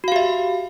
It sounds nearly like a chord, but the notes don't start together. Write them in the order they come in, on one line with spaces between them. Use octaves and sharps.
F#4 F5 G4 E5